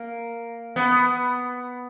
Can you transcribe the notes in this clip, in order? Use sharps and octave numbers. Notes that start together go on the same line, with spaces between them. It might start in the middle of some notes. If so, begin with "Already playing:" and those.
Already playing: A#3
B3